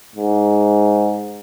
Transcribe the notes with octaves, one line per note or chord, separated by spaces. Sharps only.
G#2